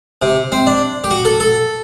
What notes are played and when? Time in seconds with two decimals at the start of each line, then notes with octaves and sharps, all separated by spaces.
0.22 C3
0.52 C4
0.67 D4
1.04 G4
1.11 F#4
1.25 A4
1.40 A4